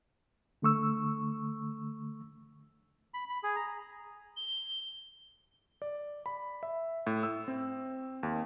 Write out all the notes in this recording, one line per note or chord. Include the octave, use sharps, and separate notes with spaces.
D3 A3 C#6 E6
B5
B5
G#4
A#5
G7
D5
B5
E5
A2
E6
C4
D#2